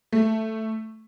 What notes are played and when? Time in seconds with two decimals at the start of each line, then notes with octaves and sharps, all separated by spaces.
0.12 A3